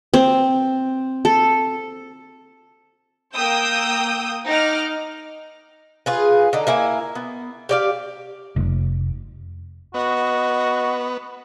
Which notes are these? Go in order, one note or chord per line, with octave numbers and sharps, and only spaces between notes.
C4
A4
A#3 G5 D#6 E6 G6
D#4 F#5 D6 F6
F4 G#4 B4
D3 D#4
A#3 E4 G#5
B3
G4 D5 F5
F1
B3 F#4 D#5